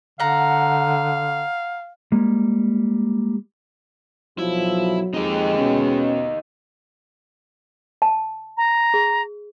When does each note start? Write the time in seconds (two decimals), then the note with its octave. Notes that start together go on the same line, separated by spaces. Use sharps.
0.20 D3 F5 F#5 A#5
2.12 G3 G#3 A#3
4.38 B1 F3 F#3 E4
5.14 F2 G#3 D#4 G4
5.59 B2 C#4
8.02 A5
8.57 A#5
8.94 G#4